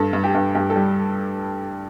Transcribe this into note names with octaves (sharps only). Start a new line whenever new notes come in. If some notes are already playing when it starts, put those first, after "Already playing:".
Already playing: G2 A4
G2
G4
G2
G2 G4
A4
G3